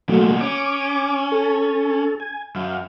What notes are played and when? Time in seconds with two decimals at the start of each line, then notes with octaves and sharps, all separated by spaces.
0.09 B2 F#3 A3 A#3
0.41 C#4 D6
1.32 A4
2.20 G#5
2.56 F#2 F5